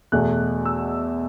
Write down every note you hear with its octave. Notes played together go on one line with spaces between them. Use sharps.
E2 B2 A3 F#6
E6